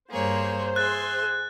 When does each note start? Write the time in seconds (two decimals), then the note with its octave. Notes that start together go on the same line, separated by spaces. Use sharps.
0.11 G2 A#3 G#4 C5 C#5
0.76 G#4 E5 C6 F#6 A6